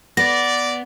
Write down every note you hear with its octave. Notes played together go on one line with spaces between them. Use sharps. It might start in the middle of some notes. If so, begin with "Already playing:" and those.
B3 D5 A#6